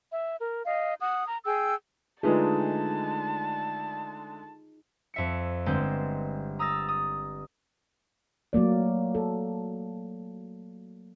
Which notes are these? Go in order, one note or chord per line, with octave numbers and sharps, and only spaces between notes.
E5
A#4
D#5 F5
F#5 D#6
A#5
G#4 G5 E6
D3 G#3 A3 D#4 F4 G#4 B4 A5
F2 E5 C#7
G1 G#3 C4 G6
A#5 D#6 E6 A6 A#6
D#6
F#3 A3 A#3 D5
A4